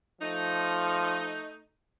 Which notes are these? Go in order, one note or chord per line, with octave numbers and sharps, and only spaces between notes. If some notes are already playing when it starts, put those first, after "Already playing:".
F3 A3 D#4